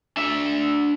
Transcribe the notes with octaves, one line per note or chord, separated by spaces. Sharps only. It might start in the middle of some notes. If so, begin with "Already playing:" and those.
D4 E5